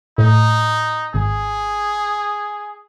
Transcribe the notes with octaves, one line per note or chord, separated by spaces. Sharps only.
A2 D#4
G#1 G#4